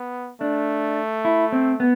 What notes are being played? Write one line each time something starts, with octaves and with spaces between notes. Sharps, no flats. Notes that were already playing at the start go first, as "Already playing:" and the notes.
Already playing: B3
A3 D4
E4
C4
B3